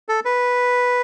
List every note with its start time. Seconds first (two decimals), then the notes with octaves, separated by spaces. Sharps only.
0.09 A4
0.25 B4